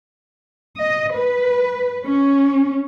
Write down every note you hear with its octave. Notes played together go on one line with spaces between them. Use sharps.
D#5
B4
C#4